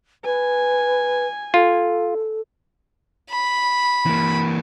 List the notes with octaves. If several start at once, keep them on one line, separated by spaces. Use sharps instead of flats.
B4 G#5
F4 A4
B5
E3 A#3